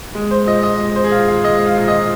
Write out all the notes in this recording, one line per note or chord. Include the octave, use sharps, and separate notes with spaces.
G#3
C5
A#2 D#5
D#5
G#3
C5
G#4
A#2 F4
F5
G#3 D#5
F5
A#2
D#5